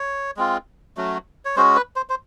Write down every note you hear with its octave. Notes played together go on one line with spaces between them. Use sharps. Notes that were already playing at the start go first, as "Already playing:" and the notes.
Already playing: C#5
G#3 C4 F4
F#3 A3 C#4 F#4
C#5
G#3 C#4 F#4 C5
B4
C5
C5